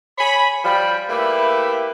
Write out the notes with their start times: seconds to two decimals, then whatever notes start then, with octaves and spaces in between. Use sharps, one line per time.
0.18 C#5 G#5 B5
0.64 F3 G3 G5 B5
1.09 A3 A#3 E4 G4 B4